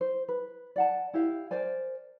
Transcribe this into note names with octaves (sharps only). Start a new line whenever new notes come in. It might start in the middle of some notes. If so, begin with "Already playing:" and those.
C5
B4
D5 F#5 A5
E4 G4 F5
A#4 C5 D5 G#5